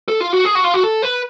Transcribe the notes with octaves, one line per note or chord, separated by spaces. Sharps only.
A4
F4
F#4
G#4
F#4
F4
F#4
A4
B4